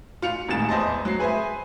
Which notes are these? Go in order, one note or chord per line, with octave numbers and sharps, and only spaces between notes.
F4 C#7 F7
D#1 A2 G#3 D#4 A6 E7
E2 C5 D#5 A5
F#3 C7
G#4 B4 C5 E5 G#5